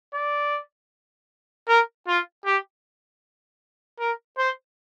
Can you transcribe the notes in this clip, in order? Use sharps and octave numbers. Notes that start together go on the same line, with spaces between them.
D5
A#4
F4
G4
A#4
C5